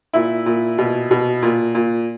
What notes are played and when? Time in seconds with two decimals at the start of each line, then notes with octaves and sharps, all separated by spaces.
0.13 A#2 E4
0.46 A#2
0.78 B2
1.11 B2
1.43 A#2
1.75 A#2